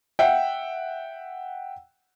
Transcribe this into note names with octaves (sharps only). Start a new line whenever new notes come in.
E5 F#5 G5